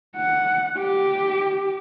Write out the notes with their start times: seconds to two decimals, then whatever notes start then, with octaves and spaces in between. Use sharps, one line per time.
0.17 F#5
0.78 G4